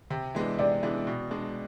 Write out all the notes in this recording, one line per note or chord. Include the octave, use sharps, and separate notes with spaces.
C3
E3 G#3 B3 D4
C3 D5
E3 G#3 B3 D4
B2
G#3 D4